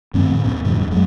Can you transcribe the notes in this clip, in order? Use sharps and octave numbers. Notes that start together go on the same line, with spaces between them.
G2 D#3 A3 C4
A2 D3 E3
E2 A#2 C4
F2 A2 D3 G3
E2 G2
F#2 F#3 G#3 A3